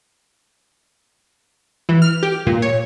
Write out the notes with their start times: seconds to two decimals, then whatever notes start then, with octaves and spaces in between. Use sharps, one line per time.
1.89 E3
2.02 F6
2.23 G4
2.47 A#2
2.62 C#5